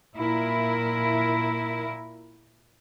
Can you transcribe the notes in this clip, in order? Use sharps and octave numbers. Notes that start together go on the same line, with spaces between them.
A#2 E4 A#4